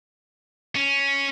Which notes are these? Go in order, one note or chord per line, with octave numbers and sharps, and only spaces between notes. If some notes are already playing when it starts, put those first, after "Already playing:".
C#4